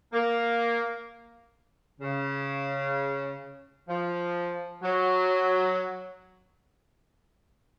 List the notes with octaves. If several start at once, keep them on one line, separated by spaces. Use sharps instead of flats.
A#3
C#3
F3
F#3